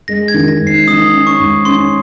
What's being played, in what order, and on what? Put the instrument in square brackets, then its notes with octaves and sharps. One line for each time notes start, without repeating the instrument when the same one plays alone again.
[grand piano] G#3 [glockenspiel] A#6
[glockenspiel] G#6
[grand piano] D#3
[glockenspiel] A#6
[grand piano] G#2
[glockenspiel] C7
[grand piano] D#3 [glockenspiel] D#6
[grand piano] C#4
[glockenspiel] C#6
[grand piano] G#2
[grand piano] C#4 [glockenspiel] C6